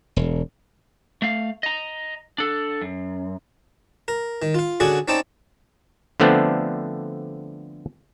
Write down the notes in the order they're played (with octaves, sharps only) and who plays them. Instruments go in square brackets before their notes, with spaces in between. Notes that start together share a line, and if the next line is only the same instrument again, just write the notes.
[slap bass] E1
[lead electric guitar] A3 F5
D#5 A#5
D4 A4
F#2
[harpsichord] A#4
D#3
F4 F5
D3 C#4 F#4 G#4 D5
C4 C#4 D#4 D5 G5 A5
[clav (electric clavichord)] D3 F3 A3 B3 C4 D4